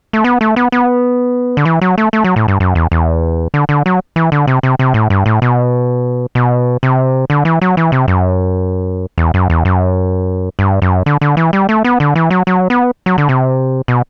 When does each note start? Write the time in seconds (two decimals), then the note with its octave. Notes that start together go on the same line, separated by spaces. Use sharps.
0.13 A3
0.24 B3
0.41 A3
0.56 B3
0.72 B3
1.57 D3
1.65 E3
1.81 F#3
1.98 A3
2.13 A3
2.24 F#3
2.36 A2
2.48 G2
2.60 F#2
2.75 E2
2.92 E2
3.54 D3
3.69 D3
3.86 F#3
4.16 E3
4.32 D3
4.47 C3
4.63 C3
4.79 C3
4.94 A2
5.10 G2
5.26 A2
5.42 B2
6.35 B2
6.83 C3
7.30 D3
7.45 E3
7.62 F#3
7.77 E3
7.92 C3
8.08 F#2
9.18 E2
9.34 F#2
9.50 E2
9.65 F#2
10.59 G2
10.82 F#2
11.06 D3
11.21 D3
11.37 E3
11.53 G3
11.69 A3
11.84 B3
12.00 D3
12.15 E3
12.31 F#3
12.47 F#3
12.70 B3
13.06 F#3
13.18 D3
13.29 C3
13.88 B2